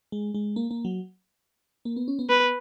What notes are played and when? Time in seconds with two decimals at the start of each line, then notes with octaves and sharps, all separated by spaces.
0.12 G#3
0.34 G#3
0.56 A#3
0.71 A#3
0.85 F#3
1.85 A#3
1.96 B3
2.08 C#4
2.19 B3
2.30 B3 B4